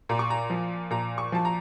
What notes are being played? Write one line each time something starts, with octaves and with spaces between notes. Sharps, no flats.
A#2 A#5
C#6
A#5
F3
A#2 A#5
C#6
F3 A5
A#5